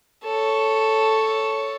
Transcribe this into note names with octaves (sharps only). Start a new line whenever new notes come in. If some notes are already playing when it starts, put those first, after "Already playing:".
A4 C#5